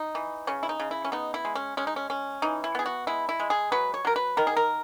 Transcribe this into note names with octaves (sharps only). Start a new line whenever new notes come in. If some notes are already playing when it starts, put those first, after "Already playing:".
Already playing: D#4
E3
C#3 C#4
E4
D#4
C#3
E4
C#4
B3 D#4
E4
G#3
C#4
G#3 C#4
D#4
C#4
C#4
E3 D#4
E4
B3 G#4
F#4
G#3 E4
E4
G#3
G#4
F#3 B4
C#5
F#3 A#4
B4
D#3 A#4
G#4
A#4